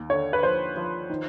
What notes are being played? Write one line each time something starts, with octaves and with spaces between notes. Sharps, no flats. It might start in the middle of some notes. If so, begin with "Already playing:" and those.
Already playing: D#2
D3 C#5
B4
F3 C5
F3
D#3